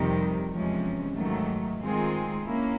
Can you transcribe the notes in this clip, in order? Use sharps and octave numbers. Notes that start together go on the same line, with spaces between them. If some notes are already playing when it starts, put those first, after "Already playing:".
Already playing: F2 C3 D#3 G3
E2 C3 F3 G#3 C#4
G#2 D#3 F#3 A3
D#3 G#3 C4 F4 G#4
A#3 C#4 E4